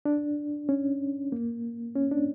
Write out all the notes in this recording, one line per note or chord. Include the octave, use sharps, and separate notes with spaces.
D4
C#4
A#3
C#4
D4